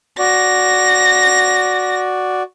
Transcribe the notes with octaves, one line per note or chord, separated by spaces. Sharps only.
F#4 D5 A#6